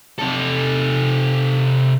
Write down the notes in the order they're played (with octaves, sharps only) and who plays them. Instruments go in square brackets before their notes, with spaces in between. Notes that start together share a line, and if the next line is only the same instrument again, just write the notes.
[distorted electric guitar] C3 A4